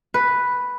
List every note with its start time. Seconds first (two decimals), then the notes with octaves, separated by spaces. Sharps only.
0.14 B4